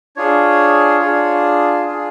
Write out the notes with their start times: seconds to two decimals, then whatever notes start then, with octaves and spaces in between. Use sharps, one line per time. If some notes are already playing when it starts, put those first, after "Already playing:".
0.16 D4 F4 G#4 C#5
1.00 D4 F4 G#4
1.84 D4 F4 G#4